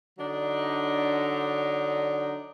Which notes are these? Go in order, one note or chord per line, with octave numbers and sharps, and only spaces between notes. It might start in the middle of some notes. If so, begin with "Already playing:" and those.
D3 F#3 D4 D#4